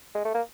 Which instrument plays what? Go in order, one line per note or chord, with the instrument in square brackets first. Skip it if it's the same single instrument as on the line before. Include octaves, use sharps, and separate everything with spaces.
[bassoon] G#3
A3
A#3